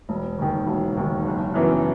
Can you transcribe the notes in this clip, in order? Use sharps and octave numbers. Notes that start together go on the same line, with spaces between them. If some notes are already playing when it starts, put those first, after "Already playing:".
E1
D#2 D#3
E1
D#2 D#3
F#1
F#2 E3 B3